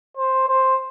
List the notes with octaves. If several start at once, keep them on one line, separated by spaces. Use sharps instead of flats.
C5
C5